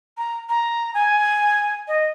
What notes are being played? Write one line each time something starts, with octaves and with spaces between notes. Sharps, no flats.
A#5
A#5
G#5
D#5